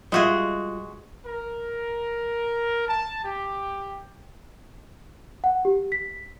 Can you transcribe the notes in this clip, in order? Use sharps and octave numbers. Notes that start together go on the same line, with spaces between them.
G3 G#3 F4 F#4 G#4 E5
A#4
A5
G4
F#5
G4
B6